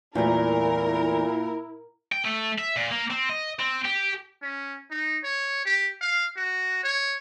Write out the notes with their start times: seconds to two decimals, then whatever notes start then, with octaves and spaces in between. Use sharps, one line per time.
0.15 E2 A#2 G3 A3 E4 A#4
2.12 G5
2.25 A3
2.58 E5
2.76 A#2
2.91 A#3
3.11 C4
3.30 D#5
3.59 C4
3.85 G4
4.42 C#4
4.91 D#4
5.24 C#5
5.65 G4
6.01 F5
6.37 F#4
6.84 C#5